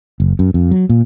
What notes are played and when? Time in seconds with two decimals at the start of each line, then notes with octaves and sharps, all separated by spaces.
0.20 F#1
0.39 F#2
0.54 F2
0.71 F#3
0.89 A#2